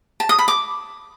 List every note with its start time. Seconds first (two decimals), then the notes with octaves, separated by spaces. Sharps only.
0.20 A5
0.29 D#6
0.39 B5
0.48 D6